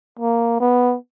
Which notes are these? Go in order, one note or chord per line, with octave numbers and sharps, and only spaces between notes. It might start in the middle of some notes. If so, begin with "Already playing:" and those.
A#3
B3